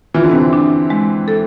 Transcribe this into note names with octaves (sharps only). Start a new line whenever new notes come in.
E3 F4
D3
C3
D3
D4
G#3
A4